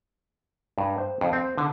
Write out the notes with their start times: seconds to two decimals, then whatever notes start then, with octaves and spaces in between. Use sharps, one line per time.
0.78 G2
0.98 C5
1.21 F2
1.33 C4
1.57 D3